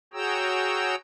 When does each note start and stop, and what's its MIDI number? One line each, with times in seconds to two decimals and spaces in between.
0.13 0.95 66
0.13 0.95 68
0.13 0.95 73
0.13 0.95 79
0.13 0.95 82
0.13 0.95 88